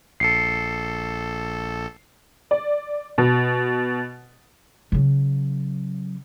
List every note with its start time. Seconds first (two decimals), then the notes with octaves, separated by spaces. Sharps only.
0.20 A#1 A4 C7 C#7
2.51 D5
3.18 B2
4.92 C#3 F#3